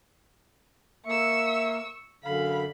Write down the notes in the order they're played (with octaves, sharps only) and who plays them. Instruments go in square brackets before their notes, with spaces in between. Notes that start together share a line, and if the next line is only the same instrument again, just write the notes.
[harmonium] A#3 [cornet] E5 [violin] C#6 E6
[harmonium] F#2 D3 [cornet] F5 [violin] B5